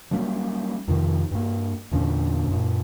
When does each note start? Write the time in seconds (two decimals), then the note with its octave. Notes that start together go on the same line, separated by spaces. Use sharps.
0.11 F#3 G3 A#3 C#4
0.88 F2 C3 D#3 F3
1.31 G2 A#3
1.92 E2 A#2 D3 C#4
2.47 F#2 A#2